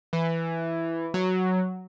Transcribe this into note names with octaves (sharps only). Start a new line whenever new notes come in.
E3
F#3